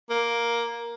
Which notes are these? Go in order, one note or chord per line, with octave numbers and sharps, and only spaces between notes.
A#3